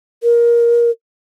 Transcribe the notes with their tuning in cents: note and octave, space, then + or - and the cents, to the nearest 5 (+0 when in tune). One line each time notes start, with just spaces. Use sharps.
A#4 +20